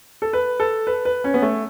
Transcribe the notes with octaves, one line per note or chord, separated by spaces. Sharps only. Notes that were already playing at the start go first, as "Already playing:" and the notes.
A4
B4
A4
B4
B4
C#4
B3
A3